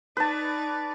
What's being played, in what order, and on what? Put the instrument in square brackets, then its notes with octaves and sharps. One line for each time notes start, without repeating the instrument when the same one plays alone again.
[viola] D#4 D5 [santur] B4 A5